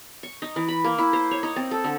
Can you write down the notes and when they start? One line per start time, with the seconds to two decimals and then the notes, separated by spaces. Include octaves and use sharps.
0.23 C#6
0.42 D#4
0.56 E3
0.69 B5
0.84 A#3
0.98 E4
1.13 C5
1.31 C#5
1.43 D#4
1.56 C4
1.71 A4
1.84 D3